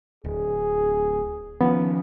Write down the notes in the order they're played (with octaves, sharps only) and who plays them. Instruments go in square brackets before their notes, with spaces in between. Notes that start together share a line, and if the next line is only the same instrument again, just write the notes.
[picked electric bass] D1 [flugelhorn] G#4
[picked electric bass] D#3 F3 C#4 [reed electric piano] B3